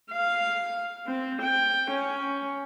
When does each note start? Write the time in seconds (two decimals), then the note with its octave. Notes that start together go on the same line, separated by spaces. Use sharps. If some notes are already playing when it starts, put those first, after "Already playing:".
0.12 F5
1.07 C4
1.41 G5
1.90 C#4